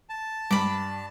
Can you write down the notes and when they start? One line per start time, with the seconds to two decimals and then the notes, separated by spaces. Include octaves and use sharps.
0.09 A5
0.51 G2 B5 D6